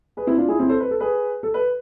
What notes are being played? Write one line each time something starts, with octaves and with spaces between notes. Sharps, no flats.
G#4 B4
C4 E4
D4 F4
E4 G#4
C4 E4
A4 C5
B4
A4
G#4 B4
A4
B4